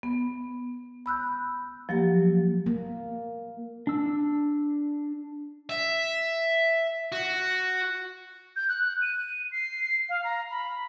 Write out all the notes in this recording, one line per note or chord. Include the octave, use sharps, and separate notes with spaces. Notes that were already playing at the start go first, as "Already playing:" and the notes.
B3
B5 E6 F#6 G6
F3 F#3 A#3 G4
A#3
D4 E6
E5
F#4
G6
F#6
D#7
C7
F5
A#5
B5